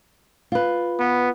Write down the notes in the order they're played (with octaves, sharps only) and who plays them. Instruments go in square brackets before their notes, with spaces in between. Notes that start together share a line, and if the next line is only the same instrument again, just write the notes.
[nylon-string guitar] F4 B4
[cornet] B3